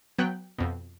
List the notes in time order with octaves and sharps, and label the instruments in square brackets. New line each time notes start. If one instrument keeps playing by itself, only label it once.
[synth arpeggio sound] F#3 B3 G5 F#6
F2 B2